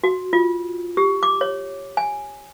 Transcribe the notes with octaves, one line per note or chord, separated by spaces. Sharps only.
F#4
F4
G4
D6
C#5
G#5